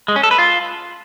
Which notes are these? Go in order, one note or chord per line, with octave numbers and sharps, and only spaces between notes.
G#3
C#4
A4
B4
F4